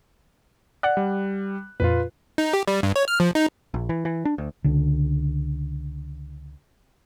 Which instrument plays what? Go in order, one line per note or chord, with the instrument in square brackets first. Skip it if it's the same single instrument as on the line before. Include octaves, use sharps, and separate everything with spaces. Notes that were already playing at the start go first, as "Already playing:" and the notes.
[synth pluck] D5 F#5 [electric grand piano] F#6
[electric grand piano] G3
[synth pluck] F2 A#2 [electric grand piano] F4 B4
[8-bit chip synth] D#4
G4
G3
G2
C#5
F6
F3
D#4
[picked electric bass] A#1
E3
E3
D4
D2
[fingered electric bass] C#2 D3